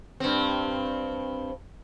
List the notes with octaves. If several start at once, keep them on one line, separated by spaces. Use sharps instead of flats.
G2 C4